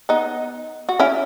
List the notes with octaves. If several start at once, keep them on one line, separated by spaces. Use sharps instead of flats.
B3 D#4
F#4
C#4 E4